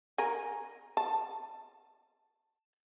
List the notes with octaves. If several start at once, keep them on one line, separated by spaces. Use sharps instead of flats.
A#4 G#5
A5